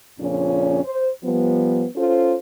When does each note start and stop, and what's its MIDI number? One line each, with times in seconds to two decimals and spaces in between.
0.19 0.83 41
0.19 0.83 46
0.19 0.83 49
0.19 0.83 53
0.19 0.83 61
0.19 0.83 62
0.83 1.09 72
1.23 1.85 53
1.23 1.85 55
1.23 1.85 59
1.95 2.35 61
1.95 2.35 65
1.95 2.35 69
1.95 2.35 72